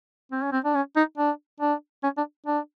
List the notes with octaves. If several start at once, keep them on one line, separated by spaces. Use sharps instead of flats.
C4
C#4
C4
D4
C#4
D#4
D4
D4
C#4
D4
D4